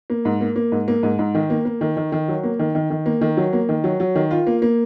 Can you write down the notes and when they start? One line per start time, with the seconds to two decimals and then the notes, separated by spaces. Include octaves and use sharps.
0.10 A#3
0.25 G#2
0.41 A#3
0.56 A#3
0.72 G#2
0.88 A#3
1.03 G#2
1.19 G#2
1.35 D#3
1.50 A#3
1.65 A#3
1.81 D#3
1.97 D#3
2.12 D#3
2.28 F#3
2.44 A#3
2.59 D#3
2.75 D#3
2.90 D#3
3.06 A#3
3.21 D#3
3.37 F#3
3.53 A#3
3.69 D#3
3.84 F#3
4.00 F#3
4.15 D#3
4.31 F4
4.47 A#3
4.62 A#3